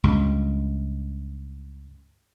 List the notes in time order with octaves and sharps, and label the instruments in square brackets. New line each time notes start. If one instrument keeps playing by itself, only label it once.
[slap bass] C#2 G2